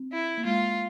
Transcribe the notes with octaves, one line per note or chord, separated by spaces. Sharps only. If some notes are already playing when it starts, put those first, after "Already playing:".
Already playing: C4
E4
A#3
G#3 F4